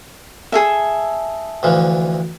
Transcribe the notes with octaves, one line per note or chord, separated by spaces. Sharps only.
G#4 A4 E5
D2 E3 F3